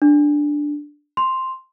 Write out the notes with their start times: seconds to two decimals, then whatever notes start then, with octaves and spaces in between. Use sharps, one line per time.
0.02 D4
1.17 C6 F7